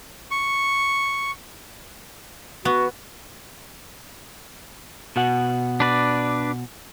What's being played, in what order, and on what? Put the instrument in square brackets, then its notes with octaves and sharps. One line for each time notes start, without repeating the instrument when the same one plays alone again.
[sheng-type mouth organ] C#6
[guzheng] B3 [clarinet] F#4
[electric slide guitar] B2 F#4 F#5
[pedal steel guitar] D4 B4 D5